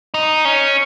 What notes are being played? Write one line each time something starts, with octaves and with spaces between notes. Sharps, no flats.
D#4
C#4